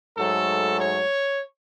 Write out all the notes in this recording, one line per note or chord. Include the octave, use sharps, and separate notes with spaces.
G#2 F#3 A3 A4
C#5